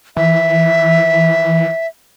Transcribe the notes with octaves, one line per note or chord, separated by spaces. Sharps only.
E3 E5